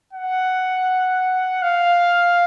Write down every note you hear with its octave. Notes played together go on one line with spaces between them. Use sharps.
F#5
F5